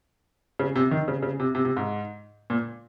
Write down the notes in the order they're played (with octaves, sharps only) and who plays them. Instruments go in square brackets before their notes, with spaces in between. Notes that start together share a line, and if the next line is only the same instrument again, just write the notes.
[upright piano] C#3
C3
D#3
C#3
C#3
C3
C3
C3
G#2
A#2